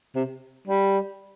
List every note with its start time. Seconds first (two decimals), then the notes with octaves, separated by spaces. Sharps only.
0.15 C3
0.67 G3